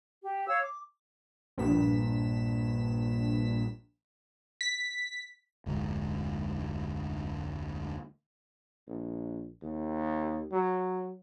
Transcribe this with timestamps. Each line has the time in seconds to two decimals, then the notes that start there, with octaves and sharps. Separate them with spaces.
0.23 G4
0.47 C#5 F5 E6
0.63 D6
1.58 A#1 G2 B6 E7
4.61 B6
5.66 F1 D2 G#2
8.87 A#1
9.62 D#2
10.52 F#3